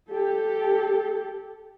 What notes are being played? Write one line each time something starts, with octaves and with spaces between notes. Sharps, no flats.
G4 A4